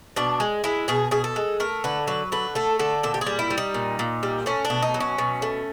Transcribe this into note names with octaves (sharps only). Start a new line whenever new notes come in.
B2 D4
G#3
G#3 E4
B2 G#4
B2 G#4
A4
G#3
A3 A#4
D3 B4
F#3 B4
D3 B4
A3 A4
D3 A4
A#2 A4
G4
G#4
G3
E4
G3
D#4
A#2
A#2
G3
A3 C#4
D4
B2
D#4
F#3
C#4
B2
A3